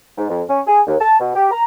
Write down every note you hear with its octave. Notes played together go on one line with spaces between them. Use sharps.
G#2
F2
C#4
G#4
D#2
A5
B2
G4
A#5